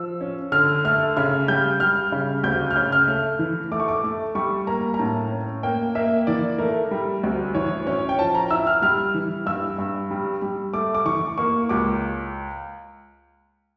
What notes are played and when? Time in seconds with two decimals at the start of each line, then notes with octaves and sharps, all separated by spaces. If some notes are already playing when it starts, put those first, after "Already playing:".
Already playing: F3 E6
0.21 C#4
0.52 D3 F6
0.85 A3 F6
1.17 C#3 F6
1.48 G3 G6
1.80 G3 F6
2.12 C#3
2.43 D2 G6
2.71 F6
2.76 C#3 G6
2.92 F6
3.08 A3
3.39 E3
3.72 A3 D6
3.80 C#6
3.88 D6
4.04 A3
4.35 G3 C#6
4.67 A#3 A#5
4.94 A#5
4.99 A2 A5
5.32 C#4
5.63 A#3 G5
5.95 A#3 E5
6.27 E3 D5
6.58 A3 A#4
6.91 G3
7.24 D2
7.55 E3 C#5
7.87 C#4 C#5
8.09 G5
8.18 F3 A5
8.35 A#5
8.51 E4 E6
8.67 F6
8.82 G3 F6
9.14 E3
9.46 G2 E6
9.79 G2
10.11 G3
10.42 G3
10.74 A3 D6
10.95 D6
11.05 E3 C#6
11.38 A#3 C#6
11.69 C#2 D6